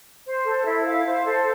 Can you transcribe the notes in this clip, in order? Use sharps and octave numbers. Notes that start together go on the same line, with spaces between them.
C5
A4
E4
F5
C5
A4